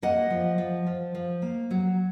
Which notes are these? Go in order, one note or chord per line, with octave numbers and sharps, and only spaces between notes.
A#3 D#5 F#5
F3
F3
F3
F3
A#3
F#3